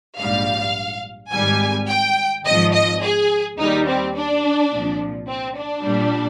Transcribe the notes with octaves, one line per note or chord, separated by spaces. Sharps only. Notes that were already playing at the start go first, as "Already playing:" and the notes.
A#1 G#2 G3 F5
G#1 G#2 G3 G#5
G5
G#1 G#2 F3 D#5
D#5
G#4
D#2 D#3 G3 D#4
C4
D4
C2 A#2 F3
C4
D4
A#1 A#2 G3